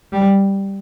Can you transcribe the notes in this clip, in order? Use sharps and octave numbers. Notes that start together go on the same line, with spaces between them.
G3